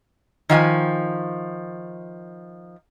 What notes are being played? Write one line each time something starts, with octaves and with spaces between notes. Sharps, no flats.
D#3 F3 F5 G#5